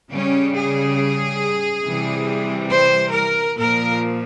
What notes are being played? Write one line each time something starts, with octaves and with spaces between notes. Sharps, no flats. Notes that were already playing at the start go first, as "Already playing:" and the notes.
C#3 G3 C#4
G#4
C3 E3 G3
C5
A#4
A#2 F3 A#4